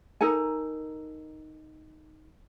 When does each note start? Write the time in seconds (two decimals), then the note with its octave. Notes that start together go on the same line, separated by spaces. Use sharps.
0.21 D#4 A4 A#4 G#5